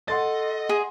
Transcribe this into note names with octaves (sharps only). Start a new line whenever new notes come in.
A4 D#5 F#5 C6 A6
G#4